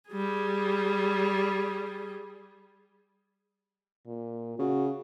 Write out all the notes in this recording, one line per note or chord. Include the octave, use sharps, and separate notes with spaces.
G3 G#4
A#2
C#3 F#4